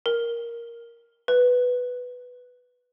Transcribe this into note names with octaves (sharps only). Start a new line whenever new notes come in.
A#4
B4